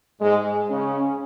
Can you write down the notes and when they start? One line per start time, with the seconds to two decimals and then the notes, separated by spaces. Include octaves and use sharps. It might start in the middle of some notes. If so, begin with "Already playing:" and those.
0.21 G#2 G#3
0.69 C#3 C#4